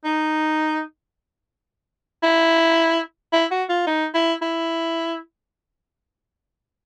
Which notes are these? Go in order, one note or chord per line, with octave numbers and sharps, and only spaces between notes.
D#4
E4
E4
F#4
F4
D#4
E4
E4